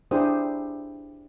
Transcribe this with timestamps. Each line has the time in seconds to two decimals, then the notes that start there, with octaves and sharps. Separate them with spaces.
0.11 D4 E4 G4 G#4 C5 D#6